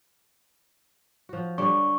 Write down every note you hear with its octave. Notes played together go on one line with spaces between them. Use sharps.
F3 F#4
D3 G3 D4 C#6